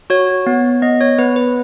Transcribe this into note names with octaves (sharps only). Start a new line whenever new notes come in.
F#4 C#5
B3
B3 D#5
C#5
B3 B4
B4